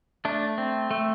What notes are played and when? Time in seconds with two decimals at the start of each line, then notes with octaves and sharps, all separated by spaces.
0.25 A3 D4
0.58 C4
0.91 A3